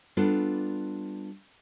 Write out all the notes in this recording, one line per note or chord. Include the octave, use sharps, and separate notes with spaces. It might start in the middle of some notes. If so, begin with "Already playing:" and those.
G3 B3 D4 F4 A4